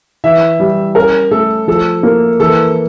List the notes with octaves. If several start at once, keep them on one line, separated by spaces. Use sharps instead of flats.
E3 E5
G3
C#4 A#4
A3 A4
F3 A4
A#3
E3 A4